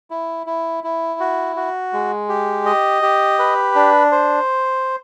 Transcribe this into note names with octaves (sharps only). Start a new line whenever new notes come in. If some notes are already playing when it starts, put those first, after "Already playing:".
E4
E4
E4
F#4
F#4
G#3
G4
D#5
G4
B4
D4
C5